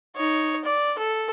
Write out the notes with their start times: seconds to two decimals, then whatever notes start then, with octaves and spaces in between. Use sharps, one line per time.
0.16 D#4 C#5
0.64 D5
0.99 A4